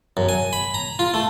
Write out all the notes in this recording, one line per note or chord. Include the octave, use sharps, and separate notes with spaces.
F#2
G#5
B5
A#5
F4
A3